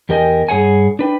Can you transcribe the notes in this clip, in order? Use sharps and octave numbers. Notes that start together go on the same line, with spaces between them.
E2 G4 A#4 D#5 G5 G#5
G2 G#4 C#5 F#5 G#5
D4 B4 G5